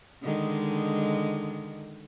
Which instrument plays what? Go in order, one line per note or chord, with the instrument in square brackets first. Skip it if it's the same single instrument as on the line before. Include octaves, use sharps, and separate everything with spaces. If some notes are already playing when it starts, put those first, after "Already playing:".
[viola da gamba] D3 D#3 G#3